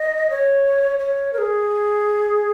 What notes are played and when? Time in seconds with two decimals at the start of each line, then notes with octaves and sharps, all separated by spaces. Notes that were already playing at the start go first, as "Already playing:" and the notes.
Already playing: D#5
0.30 C#5
0.99 C#5
1.33 A#4
1.38 G#4